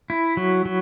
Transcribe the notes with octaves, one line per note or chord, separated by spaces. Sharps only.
E4
F#3
F#3